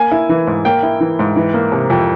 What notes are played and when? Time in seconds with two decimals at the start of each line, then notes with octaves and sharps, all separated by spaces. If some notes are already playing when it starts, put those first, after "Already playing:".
Already playing: A#3 G#5
0.12 E4
0.29 E3
0.47 G#2
0.65 A#3 G5
0.83 E4
1.00 E3
1.19 G#2
1.36 E3
1.54 A#3
1.72 C3
1.90 F2